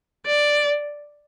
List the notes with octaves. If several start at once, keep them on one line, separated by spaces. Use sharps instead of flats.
D5